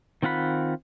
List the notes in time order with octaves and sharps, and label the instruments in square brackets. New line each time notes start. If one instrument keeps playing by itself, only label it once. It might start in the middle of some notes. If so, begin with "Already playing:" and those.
[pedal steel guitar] D#3 C4 F4 F#5 B5